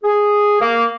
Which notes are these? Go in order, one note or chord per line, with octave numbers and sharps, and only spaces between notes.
G#4
A#3